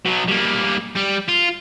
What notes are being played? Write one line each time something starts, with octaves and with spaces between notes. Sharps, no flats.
B2 F#3
G3 A#3
G3
F4